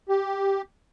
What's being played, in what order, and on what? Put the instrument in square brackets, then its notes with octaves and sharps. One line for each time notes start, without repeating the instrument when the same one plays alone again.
[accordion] G4